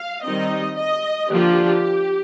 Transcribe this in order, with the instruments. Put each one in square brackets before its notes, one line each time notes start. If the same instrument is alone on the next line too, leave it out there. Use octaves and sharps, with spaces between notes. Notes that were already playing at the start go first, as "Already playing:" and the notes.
Already playing: [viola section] F5
D#3 G3 C4 D#4 D#5
D#5
D3 F3 A#3 D4 F4 G4